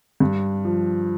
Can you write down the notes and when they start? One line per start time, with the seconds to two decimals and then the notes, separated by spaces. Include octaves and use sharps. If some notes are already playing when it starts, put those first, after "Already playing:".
0.20 G2
0.65 F3